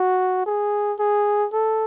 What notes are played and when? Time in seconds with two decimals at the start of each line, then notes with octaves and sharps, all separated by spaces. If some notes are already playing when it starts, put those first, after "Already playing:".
Already playing: F#4
0.46 G#4
0.99 G#4
1.53 A4